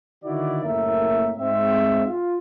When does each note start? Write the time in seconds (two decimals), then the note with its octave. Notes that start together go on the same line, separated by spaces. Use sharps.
0.25 D3 D#3 D#4 E4 F#4 D5
0.64 F#1 A2 A#3 A#4 E5
1.38 G#2 C4 E5
2.06 F4